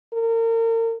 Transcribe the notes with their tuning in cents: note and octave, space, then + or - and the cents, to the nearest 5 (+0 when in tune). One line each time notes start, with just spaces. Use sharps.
A#4 -35